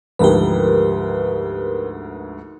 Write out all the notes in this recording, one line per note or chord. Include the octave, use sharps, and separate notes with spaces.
D2 G#2 F3 G4 A#4 B4